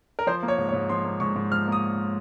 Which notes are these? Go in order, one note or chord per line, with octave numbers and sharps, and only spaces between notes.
A#4
F3 C5
A#3
C#5
G#2
C#5
G#2
F3 C6
A#3
G#2 C#6
G#2
F3 F6
A#3 D#6